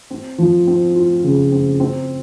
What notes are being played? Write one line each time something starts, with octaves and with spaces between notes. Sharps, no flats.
C4
F3
C4
F4
C#3
C4
C4